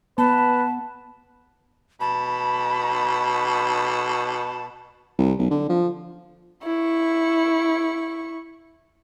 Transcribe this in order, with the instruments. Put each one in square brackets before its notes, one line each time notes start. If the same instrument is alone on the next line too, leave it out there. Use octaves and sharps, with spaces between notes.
[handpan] B3 [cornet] B4 [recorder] A5
[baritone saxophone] B2 [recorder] A5 [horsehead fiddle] B5
[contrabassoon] C2
B1
D3
F3
[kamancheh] E4 C#6